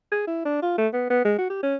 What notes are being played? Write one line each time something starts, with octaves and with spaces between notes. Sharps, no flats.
G#4
E4
D4
F4
A3
B3
B3
G#3
F#4
G4
C#4